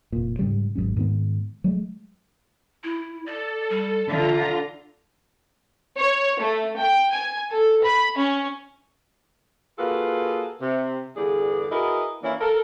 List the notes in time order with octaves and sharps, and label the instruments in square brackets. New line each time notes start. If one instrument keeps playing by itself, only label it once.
[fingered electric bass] F1 A#2
G#2 C#3 G3
G#1 G#2 F#3 C#4
G#2 D#3 A#3 B3
F#3 G#3 A3
[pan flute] E4
[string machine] A4 [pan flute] D5
[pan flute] G3
[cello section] D3 [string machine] F4 A#5 [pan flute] E5
[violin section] C#5
A3
G5
G#5
A4
B5
C#4
[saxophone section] A#3 F4 F#4 G#4 A4 B4
C3
E2 G2 D3 G#4 D5
E4 F#4 G#4 A#4 B4 D#5
E3 A#3 C#4 D4 E4
A4 A#4